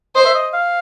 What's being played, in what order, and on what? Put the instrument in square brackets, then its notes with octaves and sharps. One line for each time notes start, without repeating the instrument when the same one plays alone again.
[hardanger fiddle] C5 [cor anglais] D#5
[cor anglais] E5
D#5
F5